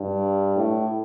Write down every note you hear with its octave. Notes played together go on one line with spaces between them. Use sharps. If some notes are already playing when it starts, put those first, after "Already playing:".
Already playing: G2
A2